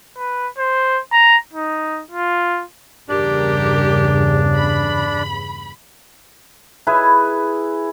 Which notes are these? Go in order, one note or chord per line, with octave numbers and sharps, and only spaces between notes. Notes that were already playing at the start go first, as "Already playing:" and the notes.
B4
C5
A#5
D#4
F4
E2 G2 C#3 D4 G4 A#4
B5
E4 G#4 B4 G#5